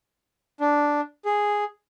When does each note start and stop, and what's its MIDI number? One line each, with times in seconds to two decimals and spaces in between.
0.61 1.01 62
1.25 1.64 68